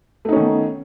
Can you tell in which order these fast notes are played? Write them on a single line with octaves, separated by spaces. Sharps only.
A3 D#4 C#4 D#3 B3